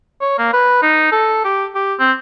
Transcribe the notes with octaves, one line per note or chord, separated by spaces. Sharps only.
C#5
A#3
B4
D#4
A4
G4
G4
C4